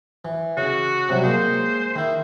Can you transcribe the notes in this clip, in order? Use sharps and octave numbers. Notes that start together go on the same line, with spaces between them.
E3
C#3 F#4
C3 F#3 G3
G#3 A#3 C5
D#3 E4